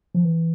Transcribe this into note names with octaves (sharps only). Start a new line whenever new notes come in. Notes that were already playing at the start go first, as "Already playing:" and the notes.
F3
E3